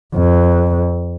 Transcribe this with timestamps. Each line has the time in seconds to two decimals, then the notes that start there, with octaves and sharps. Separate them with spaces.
0.15 F2